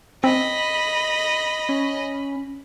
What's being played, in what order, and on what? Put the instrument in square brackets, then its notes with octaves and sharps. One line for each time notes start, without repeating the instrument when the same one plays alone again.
[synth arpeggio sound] C4 [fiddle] D#5 [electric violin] B5
[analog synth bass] C#4